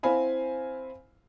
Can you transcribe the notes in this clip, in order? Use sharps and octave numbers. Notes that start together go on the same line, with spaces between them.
C4 E4 C5 F5 G#5 B5